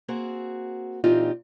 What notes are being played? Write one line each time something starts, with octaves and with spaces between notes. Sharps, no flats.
A#3 C4 F#4 G#4
A#2 E3 C4 D#4 F4 G4